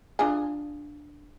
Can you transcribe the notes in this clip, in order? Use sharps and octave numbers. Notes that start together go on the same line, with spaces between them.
D4 F4 G#4